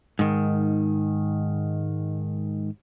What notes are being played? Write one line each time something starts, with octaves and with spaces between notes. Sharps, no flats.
G#2 D#3